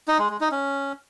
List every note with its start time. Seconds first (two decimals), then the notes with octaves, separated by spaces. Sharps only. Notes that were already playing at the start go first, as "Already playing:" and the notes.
0.08 D#4
0.19 G#3
0.30 G#3
0.41 D#4
0.52 C#4